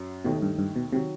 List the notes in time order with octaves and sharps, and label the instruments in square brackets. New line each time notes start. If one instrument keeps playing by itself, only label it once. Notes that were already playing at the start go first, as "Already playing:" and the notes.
Already playing: [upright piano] F#2 F#3
[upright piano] D#2 D#3 A3 D#4 [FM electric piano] B2
[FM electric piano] G2
G2
B2
[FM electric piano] C3 [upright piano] D#3 F#3